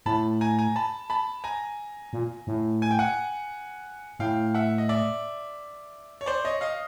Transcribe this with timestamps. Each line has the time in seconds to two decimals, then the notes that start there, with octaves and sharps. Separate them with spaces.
0.06 A2 A5 B5
0.41 G#5 A#5
0.59 G#5 A#5
0.76 A5 B5
1.10 A5 B5
1.44 G#5 A#5
2.13 A#2
2.47 A2
2.82 G#5
2.91 G5
2.99 F#5 G#5
4.19 A2 F5 G5
4.55 E5 F#5
4.78 D#5
4.89 D5 E5
6.21 C#5
6.26 C5 D5
6.45 C#5 D#5
6.61 D#5 F5